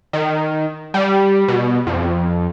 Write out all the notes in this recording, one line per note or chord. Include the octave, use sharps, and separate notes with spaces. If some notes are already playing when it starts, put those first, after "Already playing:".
D#3
G3
B2
F2